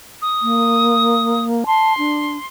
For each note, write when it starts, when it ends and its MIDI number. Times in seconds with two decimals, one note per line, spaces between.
0.22 1.45 87
0.42 1.64 58
1.66 1.93 81
1.66 2.46 84
1.98 2.37 62